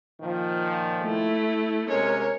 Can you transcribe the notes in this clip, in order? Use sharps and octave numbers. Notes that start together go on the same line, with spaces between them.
A#2 D#3 F3
A3 E4
C3 G#3 C#4 A#4 C#5